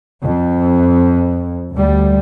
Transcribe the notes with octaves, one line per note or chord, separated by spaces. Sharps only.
F2
D2 G3